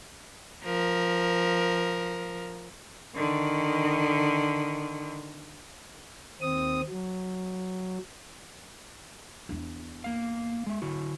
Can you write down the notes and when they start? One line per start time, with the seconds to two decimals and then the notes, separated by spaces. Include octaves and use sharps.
0.64 F3 A#4
3.15 D3 D#3
6.41 D#2 C4 D#6
6.89 F#3
9.49 E2 D4
10.04 A#3 F5
10.67 G#3 E5
10.82 D3 E4 F#4